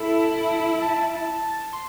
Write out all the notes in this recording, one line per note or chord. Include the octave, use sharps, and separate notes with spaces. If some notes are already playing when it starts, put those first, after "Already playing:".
Already playing: E4 A4
A5
C6